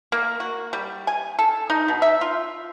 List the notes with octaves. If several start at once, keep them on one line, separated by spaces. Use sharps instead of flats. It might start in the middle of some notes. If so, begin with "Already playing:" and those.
A#3
F#4
G3
G#5
A4
D#4
B2
E5
F4